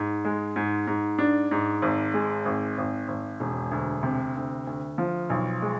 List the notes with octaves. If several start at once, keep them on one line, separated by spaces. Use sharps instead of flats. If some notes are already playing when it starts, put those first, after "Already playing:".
Already playing: G#2
G#3
G#2
G#2
D4
G#2
G#1
G#3
G#1
G#1
G#1
E1
D2
C3
D2
D2
F3
B1
G#3